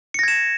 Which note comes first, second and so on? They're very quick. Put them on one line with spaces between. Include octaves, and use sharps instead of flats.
C#7 A#6 G#6 E7